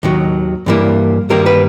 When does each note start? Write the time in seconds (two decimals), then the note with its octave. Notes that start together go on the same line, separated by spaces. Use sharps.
0.03 D#2 D#3 F#3
0.66 G2 E3 G3 A#3
1.29 G2 D#3 G3 A#3 A#4
1.46 B4